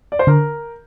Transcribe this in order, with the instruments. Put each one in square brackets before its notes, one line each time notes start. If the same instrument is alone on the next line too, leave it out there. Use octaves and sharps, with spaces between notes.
[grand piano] D5
C5
[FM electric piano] D3 [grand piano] A#4